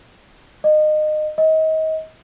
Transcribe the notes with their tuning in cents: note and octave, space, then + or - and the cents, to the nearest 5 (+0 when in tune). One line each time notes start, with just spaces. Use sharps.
D#5 -25
D#5 +30